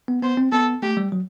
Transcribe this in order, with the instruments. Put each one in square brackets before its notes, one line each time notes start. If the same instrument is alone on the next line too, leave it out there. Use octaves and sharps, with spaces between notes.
[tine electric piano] B3
[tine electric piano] B3 [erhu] C5
[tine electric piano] C4
[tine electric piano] B3 [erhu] A4
[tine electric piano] A3 [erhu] G4
[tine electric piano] G3
F#3